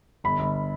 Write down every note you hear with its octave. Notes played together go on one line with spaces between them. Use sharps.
G1 B5
G1